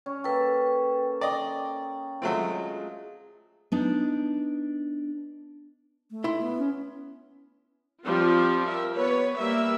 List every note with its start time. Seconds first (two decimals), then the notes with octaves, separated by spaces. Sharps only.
0.06 C#4
0.24 A#3 A4 B4 G5
1.21 D5 D#5 G5
2.22 F#3 G#3 A3 C4 F4
3.72 B3 D4 D#4
6.11 A3
6.24 E4 C6
6.41 B3
6.59 C#4
8.03 F3 G3 C4 F4
8.66 A#4 E5
8.95 B3 B4 C#5
9.36 G3 A#3 E5